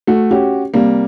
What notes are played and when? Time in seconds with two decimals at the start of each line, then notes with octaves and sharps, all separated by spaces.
0.07 A3 F#4
0.31 C#4 F#4 G4
0.74 C3 G3 A#3